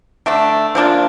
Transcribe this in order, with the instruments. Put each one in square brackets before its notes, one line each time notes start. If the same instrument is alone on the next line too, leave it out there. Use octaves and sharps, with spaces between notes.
[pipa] D3 A3 D4
F3 A#3 D4 F4